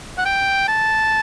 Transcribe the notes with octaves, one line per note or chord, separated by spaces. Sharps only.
F#5
G5
A5